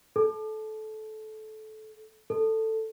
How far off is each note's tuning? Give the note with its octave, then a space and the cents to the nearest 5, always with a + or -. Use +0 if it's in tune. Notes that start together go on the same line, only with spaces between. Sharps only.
A4 -20
A4 +10